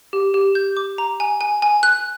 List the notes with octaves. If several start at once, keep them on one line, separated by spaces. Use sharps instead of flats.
G4
G4
G6
D6
A#5
G#5
G#5
G#5
F#6